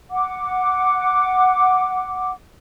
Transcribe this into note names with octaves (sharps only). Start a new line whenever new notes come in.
F#5 D6